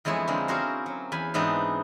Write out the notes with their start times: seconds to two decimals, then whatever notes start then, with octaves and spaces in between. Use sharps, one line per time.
0.05 F2 E3 G#3 B3 E4 C#5
0.27 D3 G#3 A#3 C4
0.48 C4 C#4 F#4 G#4 A#4 C5
0.86 F#3
1.12 E2 G#5 B5
1.34 G#2 E3 B3 C4 D4 D#4